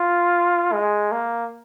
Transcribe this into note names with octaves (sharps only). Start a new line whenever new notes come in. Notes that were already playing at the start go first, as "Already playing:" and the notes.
Already playing: F4
G#3
A#3